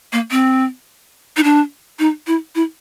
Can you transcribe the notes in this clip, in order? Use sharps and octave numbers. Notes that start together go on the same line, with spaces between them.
A#3
C4
D#4
D4
D#4
E4
E4